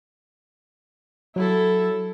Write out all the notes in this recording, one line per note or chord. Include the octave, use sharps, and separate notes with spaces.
F#3 E4 A4